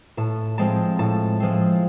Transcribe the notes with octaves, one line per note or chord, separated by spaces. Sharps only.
A2 A5
F3 G#3 C4 A5
A2 A5
F3 G#3 C4